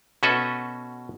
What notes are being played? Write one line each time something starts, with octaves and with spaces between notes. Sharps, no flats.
B2 C#4 F#4 A4 B4 E5